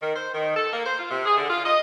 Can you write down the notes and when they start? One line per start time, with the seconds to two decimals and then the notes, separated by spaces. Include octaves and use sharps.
0.01 D#3
0.16 C5
0.33 D#3
0.56 A4
0.73 A#3
0.86 C5
0.98 F4
1.10 C3
1.25 G#4
1.37 D3
1.50 F4
1.65 D#5